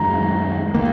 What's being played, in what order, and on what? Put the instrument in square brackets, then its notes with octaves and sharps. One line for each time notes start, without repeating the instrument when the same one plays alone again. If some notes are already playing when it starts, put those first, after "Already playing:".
Already playing: [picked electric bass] F#2 D#3 G#3 [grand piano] A#5
[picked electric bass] D#3 A#3